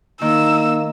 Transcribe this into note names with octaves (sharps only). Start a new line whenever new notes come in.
D#3 A#3 D#4 E6